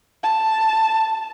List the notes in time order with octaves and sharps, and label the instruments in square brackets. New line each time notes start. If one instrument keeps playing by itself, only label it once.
[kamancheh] A5